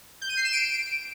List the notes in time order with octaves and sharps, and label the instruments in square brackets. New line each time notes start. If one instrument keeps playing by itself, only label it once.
[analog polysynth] G6
D#7
C7
E7
D7